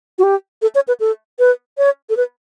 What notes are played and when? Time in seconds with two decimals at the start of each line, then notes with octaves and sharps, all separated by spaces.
0.19 F#4
0.23 G4
0.62 A4
0.75 C#5
0.88 B4
1.00 A4
1.39 B4
1.78 C#5
2.10 A4
2.17 B4